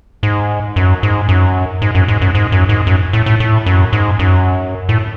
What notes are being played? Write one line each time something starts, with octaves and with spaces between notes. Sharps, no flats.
G#2
F#2
G#2
F#2
G#2
F#2
G#2
F#2
G#2
F#2
G#2
F#2
A2
A2
A2
F#2
G#2
F#2
A2